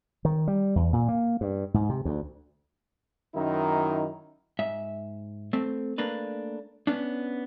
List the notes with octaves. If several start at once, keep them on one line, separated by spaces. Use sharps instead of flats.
D#3
G3
E2
A#2
A#3
G2
G#2
C3
D2
F#2 D#3 D#4 E4
G#2 E5
A3 C4
A3 A#3 D4 B4
B3 C#4 D4